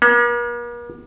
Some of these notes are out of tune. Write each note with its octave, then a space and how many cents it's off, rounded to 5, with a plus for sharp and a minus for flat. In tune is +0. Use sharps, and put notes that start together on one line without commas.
A#3 +45